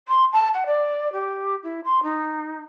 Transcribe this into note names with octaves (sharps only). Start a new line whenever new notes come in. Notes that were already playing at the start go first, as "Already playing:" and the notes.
C6
A5
F#5
D5
G4
E4
C6
D#4